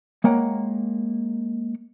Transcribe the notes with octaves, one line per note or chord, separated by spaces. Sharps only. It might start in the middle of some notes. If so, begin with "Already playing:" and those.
G#3 A#3 C#5 F#5 G5